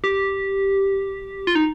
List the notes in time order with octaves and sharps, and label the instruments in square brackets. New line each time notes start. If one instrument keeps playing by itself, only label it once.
[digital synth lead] G4
F4
D#4